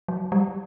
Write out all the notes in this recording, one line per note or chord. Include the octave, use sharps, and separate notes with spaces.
F#3
G3